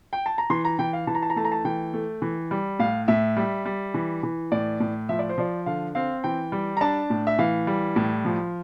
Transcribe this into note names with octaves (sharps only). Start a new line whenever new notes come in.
G5
A5
A#5
E3 C6
A#5
E3 G5
F5
E3 A5
A#5
A5
A#5
A3 A5
A#5
A5
E3 G5
A3
E3
G3
A2 F5
A2 E5
G3
G3
E3
E3
A2 D5
A2
F3 E5
D5
C5
F3 D5
D3 F5
C4 F5
E3 G5
G3
A#5
D4 A5
A2
E5
E3 F5
G3
A2
F3